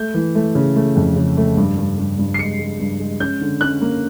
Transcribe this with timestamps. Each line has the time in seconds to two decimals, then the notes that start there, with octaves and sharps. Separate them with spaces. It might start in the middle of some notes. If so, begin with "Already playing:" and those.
Already playing: A3 G6
0.15 E3
0.35 A3
0.55 C#3
0.76 A3
0.96 F2
1.16 C#3
1.37 A3
1.57 G2
1.77 G2
1.98 G2
2.18 G2
2.34 C7
2.39 G#3 C#7
2.59 G#3
2.79 G2
3.00 G#3
3.20 C#4 G6
3.41 D3
3.61 C#4 F#6
3.81 A#3